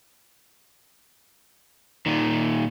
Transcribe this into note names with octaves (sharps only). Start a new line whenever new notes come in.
A#2 D#3